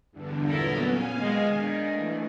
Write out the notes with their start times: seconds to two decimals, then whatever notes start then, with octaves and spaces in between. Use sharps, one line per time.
0.12 E2 G2 D3
0.48 A#2 F#3 B3 E4 A4 A#4
0.87 C#4 F5 G#5
1.20 D#3 G#3
1.54 D#3 D4
1.92 E3 A3